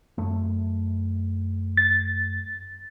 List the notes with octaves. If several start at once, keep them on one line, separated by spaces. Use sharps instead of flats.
F#2 A3
A6